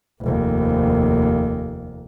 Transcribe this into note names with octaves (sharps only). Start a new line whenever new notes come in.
F1 D#2